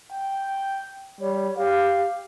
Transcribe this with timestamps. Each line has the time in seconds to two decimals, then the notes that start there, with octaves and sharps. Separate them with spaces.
0.11 G5
1.21 G3 C#5
1.58 G4 F5